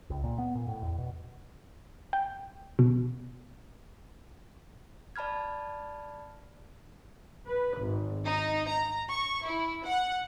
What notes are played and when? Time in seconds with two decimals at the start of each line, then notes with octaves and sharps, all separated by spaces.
0.10 C#2
0.24 A#2
0.38 B3
0.55 A#2
0.68 A2
0.83 E2
0.98 B2
2.13 G5
2.79 B2
5.16 D5 A5 B5 F6 G#6
7.47 B4
7.78 G#1
8.26 D#4
8.67 A#5
9.08 C#6
9.45 E4
9.85 F#5